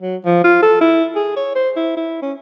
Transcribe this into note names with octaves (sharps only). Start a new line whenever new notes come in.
F#3
F3
F4
A4
E4
G#4
C#5
C5
E4
E4
C#4